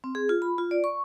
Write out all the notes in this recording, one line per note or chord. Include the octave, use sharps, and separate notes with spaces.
C4
G#4
F4
B5
F4
D5
C#6